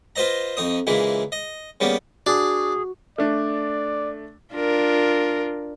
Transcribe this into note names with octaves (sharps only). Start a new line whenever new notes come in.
F4 B4 C5 D#5 A#5
F2 D#4 D#6
A#2 C#3 E3 G#3 E4
D#5
C#3 G3 A#3 B3
D4 F#4 G#4
A3 D4 D5
D4 F4 A#4